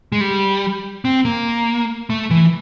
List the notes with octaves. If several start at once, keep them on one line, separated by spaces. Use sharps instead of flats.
G#3
G3
C4
A#3
A3
E3